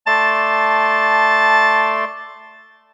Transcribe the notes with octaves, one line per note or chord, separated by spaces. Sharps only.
A3 D5 A5 C6